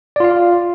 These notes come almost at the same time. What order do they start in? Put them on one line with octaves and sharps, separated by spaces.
D5 F4 F5